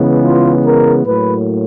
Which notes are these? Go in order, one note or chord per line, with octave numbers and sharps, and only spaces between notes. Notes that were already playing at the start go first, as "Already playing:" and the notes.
Already playing: C#3 E3 G#3 B3
F4
A#4
A2 F#3 A#3 B4